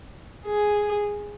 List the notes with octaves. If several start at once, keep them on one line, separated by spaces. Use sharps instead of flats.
G#4